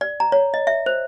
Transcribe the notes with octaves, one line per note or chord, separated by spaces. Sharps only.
D5
A#5
C#5
D#5
E5
C5